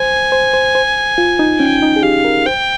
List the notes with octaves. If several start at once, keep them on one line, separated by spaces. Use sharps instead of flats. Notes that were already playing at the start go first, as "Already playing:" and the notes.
Already playing: C5 G#5
C5
C5
C5
F4
D#4
C#4 G5
D#4
G#4
G4 F5
A#4
C5 G5